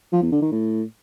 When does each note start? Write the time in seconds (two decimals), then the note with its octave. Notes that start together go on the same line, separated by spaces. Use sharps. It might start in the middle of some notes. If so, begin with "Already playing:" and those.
0.12 F3
0.22 E2
0.32 D3
0.42 D#3
0.52 A2